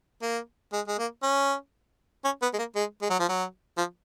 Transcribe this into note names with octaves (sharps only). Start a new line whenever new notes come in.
A#3
G#3
G#3
A#3
C#4
C#4
B3
G#3
A#3
G#3
G#3
F#3
F3
F#3
F3